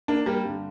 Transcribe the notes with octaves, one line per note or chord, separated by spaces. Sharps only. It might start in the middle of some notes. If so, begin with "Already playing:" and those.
A#3 D4
G3 A#3
G2 D3